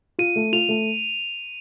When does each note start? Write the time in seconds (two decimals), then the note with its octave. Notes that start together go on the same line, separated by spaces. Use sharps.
0.19 F4 D#7
0.36 A3
0.53 F4 F7
0.69 A3